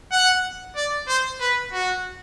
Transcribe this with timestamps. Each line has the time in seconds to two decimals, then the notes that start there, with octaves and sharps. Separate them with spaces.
0.12 F#5
0.76 D5
1.08 C5
1.40 B4
1.72 F#4